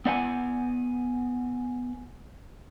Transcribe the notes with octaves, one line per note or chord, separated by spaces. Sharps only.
B3 D5 F#5 G#5